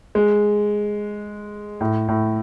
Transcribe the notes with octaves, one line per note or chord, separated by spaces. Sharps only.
G#3
A2
A2